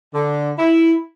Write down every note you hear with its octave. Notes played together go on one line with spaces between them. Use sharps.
D3
E4